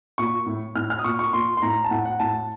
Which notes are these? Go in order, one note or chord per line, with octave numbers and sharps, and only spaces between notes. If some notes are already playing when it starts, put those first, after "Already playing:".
A#2 C#6
A2
A2 F6
F6
D#6
A#2 C#6
C#6
A#2 C6
C6
A2 A#5
A5
A2 F#5
F#5
A2 A5